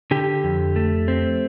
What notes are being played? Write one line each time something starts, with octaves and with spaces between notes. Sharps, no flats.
D3 G4
F2
A3
C4